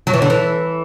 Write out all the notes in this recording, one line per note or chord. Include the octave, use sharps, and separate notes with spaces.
F#3
E3
D3
E3